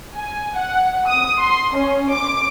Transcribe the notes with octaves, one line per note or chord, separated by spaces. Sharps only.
G#5
F#5
D#6
C6
C#4
D6